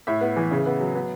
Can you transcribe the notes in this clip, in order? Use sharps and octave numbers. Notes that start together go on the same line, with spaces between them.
A2 E5
B3
E3
C#3
B3
F#3
B3